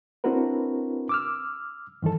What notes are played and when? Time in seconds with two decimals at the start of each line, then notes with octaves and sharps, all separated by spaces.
0.24 C4 D4 E4 F#4 A#4 B4
1.09 D6 E6 F6
2.02 G2 D#3 E3 A4